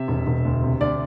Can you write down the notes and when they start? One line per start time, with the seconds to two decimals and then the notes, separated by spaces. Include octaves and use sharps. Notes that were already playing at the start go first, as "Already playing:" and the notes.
Already playing: C3 E5
0.08 E1
0.27 E1
0.45 D2
0.63 C3
0.81 D2 D5